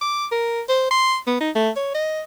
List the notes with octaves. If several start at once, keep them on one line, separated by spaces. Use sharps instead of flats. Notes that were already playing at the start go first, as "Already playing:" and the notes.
D6
A#4
C5
C6
B3
D#4
A3
C#5
D#5